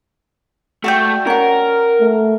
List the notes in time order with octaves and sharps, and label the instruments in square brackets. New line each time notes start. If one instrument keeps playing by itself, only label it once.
[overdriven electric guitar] A3 [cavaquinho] F#4 D5 G5
[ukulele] C#4 F#5 [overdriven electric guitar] A#4
[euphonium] A3